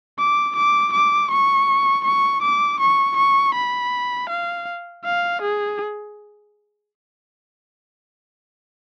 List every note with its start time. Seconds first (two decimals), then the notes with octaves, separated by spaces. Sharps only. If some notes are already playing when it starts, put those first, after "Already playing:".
0.19 D6
0.56 D6
0.93 D6
1.31 C#6
2.05 C#6
2.42 D6
2.80 C#6
3.17 C#6
3.55 B5
4.30 F5
5.04 F5
5.42 G#4